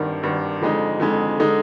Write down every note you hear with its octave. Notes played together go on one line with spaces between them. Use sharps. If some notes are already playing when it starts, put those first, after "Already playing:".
Already playing: G#1 G2 D#3
G#1 G2 D#3
F2 D3 G#3 D#4
F2 D3 G#3 D#4
D3 G#3 D#4